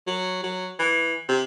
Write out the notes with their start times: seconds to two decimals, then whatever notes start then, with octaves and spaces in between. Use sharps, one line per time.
0.07 F#3
0.43 F#3
0.79 E3
1.28 C3